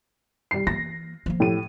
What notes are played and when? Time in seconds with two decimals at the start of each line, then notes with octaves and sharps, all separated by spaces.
0.51 G3 C7
0.67 E3 A#3 A#6
1.26 F3 A#3
1.40 A2 G4 D#7